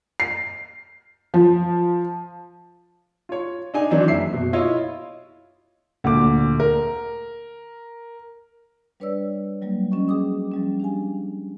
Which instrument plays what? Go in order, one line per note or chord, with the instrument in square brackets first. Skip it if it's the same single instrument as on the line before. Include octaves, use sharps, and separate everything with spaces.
[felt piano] C7
F3
[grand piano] F4 C#5
D4 D#4 G#5
D#3 E3 F#3 C4 D4
F#1 E5 C7
B2
E4 F4 C#5 D#5
D2 A#2 D6
A#4
[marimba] G3 D4 B4 C#5 D5 E6
F#3 G3 A#3
F3 C#4 F#4 D#5 C#6
G#4 G5 D6 D#6
F3 G3 C#4
D4 G4 F5 G#5